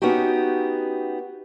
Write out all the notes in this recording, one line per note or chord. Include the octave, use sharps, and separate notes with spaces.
B3 C#4 D#4 F#4 G4